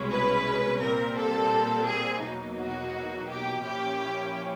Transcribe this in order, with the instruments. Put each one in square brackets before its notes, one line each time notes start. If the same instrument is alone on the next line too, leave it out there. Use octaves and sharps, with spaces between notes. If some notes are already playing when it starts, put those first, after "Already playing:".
Already playing: [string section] C2 B2 G#3 C#4 E4
B4
A#2 G3 C4 A#4
A4
G#4
E2 B2 F#3 A#3 D#4
F#4
G4
A#2 F3 A#3 C#4 E4 G4